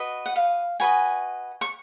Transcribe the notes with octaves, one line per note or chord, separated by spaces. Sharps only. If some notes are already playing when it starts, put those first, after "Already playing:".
Already playing: F#4 B4 D#5
F#5
F5
F#4 B4 D#5 G#5
C#6